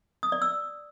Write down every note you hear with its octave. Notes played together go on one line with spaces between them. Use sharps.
D#6
D5
E6